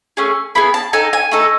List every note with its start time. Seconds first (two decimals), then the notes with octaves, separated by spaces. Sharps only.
0.17 A3 C#4 G#4
0.55 B3 E4 G#4 B5
0.74 A5
0.93 D#4 A4 G#5
1.13 G#5
1.32 A3 D#4 A4